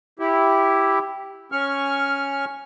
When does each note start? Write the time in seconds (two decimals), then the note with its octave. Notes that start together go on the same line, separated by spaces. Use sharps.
0.19 E4 G4
1.52 C#4 C#6 F6